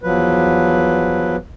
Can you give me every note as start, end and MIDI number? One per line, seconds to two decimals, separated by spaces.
0.03 1.36 40
0.03 1.36 53
0.03 1.36 54
0.03 1.36 71